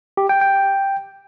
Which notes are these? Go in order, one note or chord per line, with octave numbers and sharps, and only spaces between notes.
G4
G5
G5